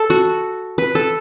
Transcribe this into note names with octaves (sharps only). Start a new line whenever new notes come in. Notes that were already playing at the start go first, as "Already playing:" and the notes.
Already playing: A4
F#4
B4
A4